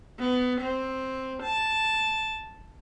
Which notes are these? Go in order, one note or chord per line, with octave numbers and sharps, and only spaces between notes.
B3
C4
A5